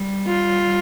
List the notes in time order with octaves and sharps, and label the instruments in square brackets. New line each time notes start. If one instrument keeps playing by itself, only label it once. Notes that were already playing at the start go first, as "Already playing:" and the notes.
Already playing: [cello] G3
[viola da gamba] F4